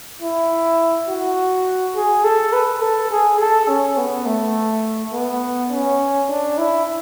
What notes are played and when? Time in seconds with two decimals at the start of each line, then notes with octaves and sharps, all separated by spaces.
0.22 E4
1.08 F#4
1.96 G#4
2.24 A4
2.53 B4
2.82 A4
3.11 G#4
3.40 A4
3.68 C#4
3.98 B3
4.26 A3
5.13 B3
5.71 C#4
6.29 D4
6.58 E4